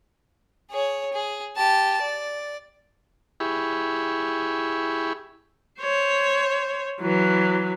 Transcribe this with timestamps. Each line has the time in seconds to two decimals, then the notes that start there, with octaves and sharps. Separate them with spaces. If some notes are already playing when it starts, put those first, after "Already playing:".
0.71 G#4 C#5
1.13 G#4
1.56 G4 A5
2.01 D5
3.40 E4 G4 G#4 B5 C#6
5.80 C5 C#5
7.01 E3 F#3